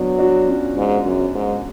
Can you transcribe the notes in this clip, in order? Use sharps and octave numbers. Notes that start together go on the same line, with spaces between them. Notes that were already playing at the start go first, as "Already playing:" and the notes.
Already playing: F#3 B3 D4
D4 F#4
C#4 F4
G#2
F#2
G#2